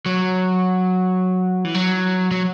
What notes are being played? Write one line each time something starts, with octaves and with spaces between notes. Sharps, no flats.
F#3
E3
F#3
F#3